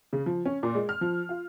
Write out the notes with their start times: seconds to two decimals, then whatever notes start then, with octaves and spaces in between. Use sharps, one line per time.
0.13 C#3
0.26 F3
0.45 C#4
0.63 A#2
0.75 G#3
0.89 F6
1.01 F3
1.29 F4